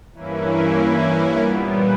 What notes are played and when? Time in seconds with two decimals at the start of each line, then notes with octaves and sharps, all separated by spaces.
0.13 G2 E3 A#3 C#4 E4
1.37 A#2 G3 B3